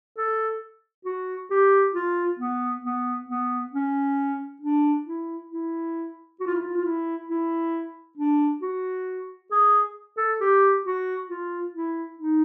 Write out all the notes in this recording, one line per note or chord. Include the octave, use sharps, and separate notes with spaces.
A4
F#4
G4
F4
B3
B3
B3
C#4
D4
E4
E4
F#4
F4
E4
F4
F4
E4
E4
D4
F#4
G#4
A4
G4
F#4
F4
E4
D#4